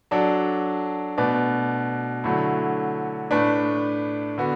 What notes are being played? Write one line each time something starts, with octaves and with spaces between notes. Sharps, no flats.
F#3 D4 A4 D5
B2 A3 D4 B4 D5
D3 F#3 A3 E4
A2 A3 D4 B4
D3 B3 F#4